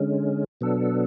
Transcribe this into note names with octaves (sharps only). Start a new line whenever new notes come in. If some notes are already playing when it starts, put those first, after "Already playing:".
Already playing: D3 G#3 C#4
B2 F#3 B3 D4 A4